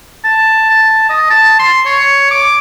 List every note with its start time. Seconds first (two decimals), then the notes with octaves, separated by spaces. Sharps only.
0.24 A5
0.70 A5
1.10 D#5
1.30 A5
1.59 C6
1.86 C#5
2.31 D6